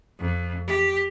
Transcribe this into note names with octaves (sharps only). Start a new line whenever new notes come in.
F2
G4